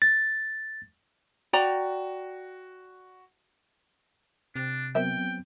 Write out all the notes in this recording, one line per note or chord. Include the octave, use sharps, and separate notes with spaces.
A6
F#4 D5 G5 A#5
C3 D4
F#3 B3 C4 A#4 C5 E5 G5